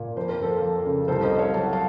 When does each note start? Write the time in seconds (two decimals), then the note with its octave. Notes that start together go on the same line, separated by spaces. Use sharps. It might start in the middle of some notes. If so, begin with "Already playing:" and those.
Already playing: A#2
0.16 F2 C5
0.29 A#4
0.39 F2 A4 C5
0.62 F3
0.86 C#3
1.08 C2 A4 C5
1.23 C5 D#5
1.31 C2
1.38 C#5 F5
1.54 F#3 A5
1.63 F#5
1.73 F5 A5